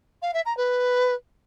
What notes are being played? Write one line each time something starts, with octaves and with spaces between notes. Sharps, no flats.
F5
E5
A#5
B4